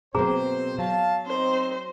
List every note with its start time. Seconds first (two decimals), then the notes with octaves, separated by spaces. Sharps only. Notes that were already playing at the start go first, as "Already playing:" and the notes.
0.15 B2 F#3 A#3 C4 G#4 C5 A#5
0.78 F#3 F5 A5
1.27 C4 D#4 C5